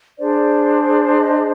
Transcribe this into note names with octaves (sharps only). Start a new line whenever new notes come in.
D4 G#4 C5 D5
D#5